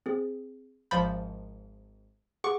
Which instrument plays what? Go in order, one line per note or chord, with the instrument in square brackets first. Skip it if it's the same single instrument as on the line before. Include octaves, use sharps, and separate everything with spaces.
[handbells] C4 G#4
[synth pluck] G#1 F3 B5 [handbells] G6 A6
[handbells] G#4 F#5 D6 [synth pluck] C#6